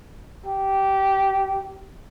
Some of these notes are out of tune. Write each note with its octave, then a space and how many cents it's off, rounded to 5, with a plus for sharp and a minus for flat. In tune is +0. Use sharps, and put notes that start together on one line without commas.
G4 -15